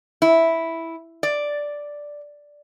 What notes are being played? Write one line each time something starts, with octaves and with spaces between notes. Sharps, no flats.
E4
D5